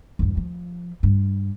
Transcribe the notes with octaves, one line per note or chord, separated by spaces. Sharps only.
E2 G2
F3
G2